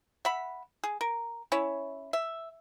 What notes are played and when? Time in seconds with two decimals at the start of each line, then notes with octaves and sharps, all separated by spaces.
0.25 E5 F#5 B5
0.84 G#4
1.01 A#4
1.52 C#4 E4 C#5
2.13 E5